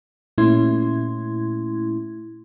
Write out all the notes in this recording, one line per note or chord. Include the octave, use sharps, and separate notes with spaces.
A#2 A3 C#4 E4 C6 G#6